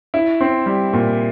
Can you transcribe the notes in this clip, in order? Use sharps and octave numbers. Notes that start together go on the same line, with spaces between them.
E4
C4
G3
A#2